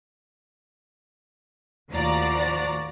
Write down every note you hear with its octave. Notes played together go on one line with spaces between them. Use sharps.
D#2 A2 F3 F#4 D5 A#5